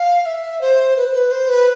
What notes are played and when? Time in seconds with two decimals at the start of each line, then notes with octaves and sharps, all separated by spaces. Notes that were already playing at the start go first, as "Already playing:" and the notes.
Already playing: F5
0.26 E5
0.61 C5
0.97 B4
1.12 C5
1.15 B4
1.31 C5
1.49 B4